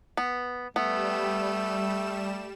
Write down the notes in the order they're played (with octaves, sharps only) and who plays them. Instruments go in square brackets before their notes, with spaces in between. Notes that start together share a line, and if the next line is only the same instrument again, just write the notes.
[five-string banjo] B3
[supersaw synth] G3 E7 [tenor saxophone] A3 [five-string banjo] B3